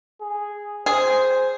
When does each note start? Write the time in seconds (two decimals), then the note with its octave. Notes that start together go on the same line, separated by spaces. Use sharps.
0.21 G#4
0.86 G#4 C5